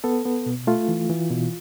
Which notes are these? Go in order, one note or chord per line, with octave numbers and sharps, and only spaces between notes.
B3 A4
B3
B2
A3 F4
E3
E3
B2